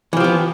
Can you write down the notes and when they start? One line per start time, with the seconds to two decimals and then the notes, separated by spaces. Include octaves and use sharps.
0.13 E3
0.17 F3
0.20 G4
0.24 B3